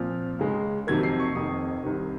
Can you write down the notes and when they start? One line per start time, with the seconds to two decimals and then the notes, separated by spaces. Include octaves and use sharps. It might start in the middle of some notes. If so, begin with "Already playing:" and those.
Already playing: A#2 F3 C4 F4 F6
0.39 C#2 C#3 G#3
0.87 F2 C3 D#3 F#3 A#3 G#6
1.03 C7
1.20 C#6
1.35 F1 F2 D#3 D#6
1.84 C2 C3 D#3